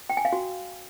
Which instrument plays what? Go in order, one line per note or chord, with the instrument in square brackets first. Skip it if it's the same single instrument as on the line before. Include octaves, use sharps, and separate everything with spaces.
[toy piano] G5
G#5
F5
F#4